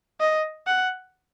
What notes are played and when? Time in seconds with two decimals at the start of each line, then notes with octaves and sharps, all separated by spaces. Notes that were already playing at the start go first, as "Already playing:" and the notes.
0.20 D#5
0.67 F#5